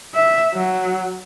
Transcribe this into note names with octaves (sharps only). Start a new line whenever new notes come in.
E5
F#3